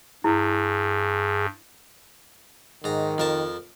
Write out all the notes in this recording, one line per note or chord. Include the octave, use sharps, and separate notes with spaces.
G2 E4 G#4
G#2 D#3 A#5
F2 A#4 A5